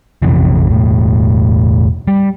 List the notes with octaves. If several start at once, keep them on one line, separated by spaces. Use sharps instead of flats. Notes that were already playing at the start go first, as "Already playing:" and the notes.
A#1 F2 C3 E3
E1 A2
G3